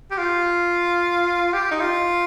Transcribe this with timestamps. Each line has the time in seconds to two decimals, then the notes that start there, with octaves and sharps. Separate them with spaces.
0.11 G4
0.18 F4
1.53 G4
1.71 D#4
1.80 F4